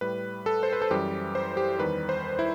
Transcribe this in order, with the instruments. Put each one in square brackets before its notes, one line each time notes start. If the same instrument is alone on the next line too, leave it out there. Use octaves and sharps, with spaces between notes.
[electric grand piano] A2 G3 B4
A4
C5
B4
A4
F#2 E3 G3 G4
C5
G4
E2 D#3 G3 B4
C5
E4